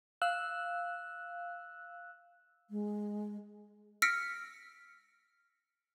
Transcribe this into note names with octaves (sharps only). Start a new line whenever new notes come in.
F5 E6 F#6
G#3
E6 F6 A#6 B6 C#7 D7